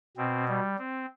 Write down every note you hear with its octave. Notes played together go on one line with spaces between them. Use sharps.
B2 C4
G3
C4